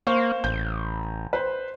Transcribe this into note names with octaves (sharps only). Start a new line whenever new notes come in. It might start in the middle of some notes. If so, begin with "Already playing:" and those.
A#3 C5 F5 C#6
A1 G6
B4 C5